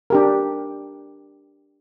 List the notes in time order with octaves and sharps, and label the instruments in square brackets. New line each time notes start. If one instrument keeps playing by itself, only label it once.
[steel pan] D4 G4 A#4